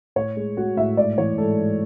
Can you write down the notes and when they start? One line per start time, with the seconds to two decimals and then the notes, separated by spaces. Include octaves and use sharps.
0.16 A2 C#5
0.36 G#3
0.57 G#3 F#4
0.77 A2 E5
0.97 G#2 D5
1.18 E3 C#5
1.38 G#2 A4
1.58 G#2